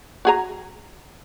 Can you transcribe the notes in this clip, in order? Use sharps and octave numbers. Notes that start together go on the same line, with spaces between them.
F#4 G#4 A#5